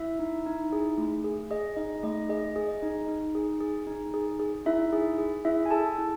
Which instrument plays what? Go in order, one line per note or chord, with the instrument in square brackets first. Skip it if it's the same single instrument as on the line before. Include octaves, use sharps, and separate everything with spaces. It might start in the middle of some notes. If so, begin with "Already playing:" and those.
Already playing: [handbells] E4 E5
D#4
D#4
G#4
A3
G#4
G#4 D#5
D#4 D#5
A3 D#5
G#4 D#5
G#4
D#5
D#4
D#4
G#4
G#4
D#4
G#4
G#4
D#4 E4 E5
G#4
G#4
E4 G#4 E5
G#5
G#4 A4 A5
E4